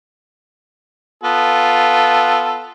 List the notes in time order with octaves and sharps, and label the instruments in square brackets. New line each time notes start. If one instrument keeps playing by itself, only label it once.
[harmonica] B3 F4 A4